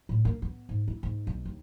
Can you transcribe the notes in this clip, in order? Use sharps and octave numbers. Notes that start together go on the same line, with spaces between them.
A2
A#3
B3
G#2
E4
G#2
B1
D#2